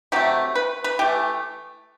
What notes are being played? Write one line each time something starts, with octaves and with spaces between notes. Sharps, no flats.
C3 F#3 A3 G4
B4
B4
E3 A3 G4